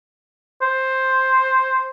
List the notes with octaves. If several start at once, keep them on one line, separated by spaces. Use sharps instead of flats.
C5